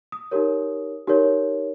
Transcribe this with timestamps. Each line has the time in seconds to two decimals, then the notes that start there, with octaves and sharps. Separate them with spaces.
0.12 D#6
0.31 D#4 G4 A#4 C#5
1.07 D#4 G4 A#4 C#5